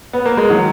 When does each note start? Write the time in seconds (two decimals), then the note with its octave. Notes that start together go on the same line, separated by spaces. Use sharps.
0.13 B3
0.26 A#3
0.37 G#3
0.50 D#3 F#3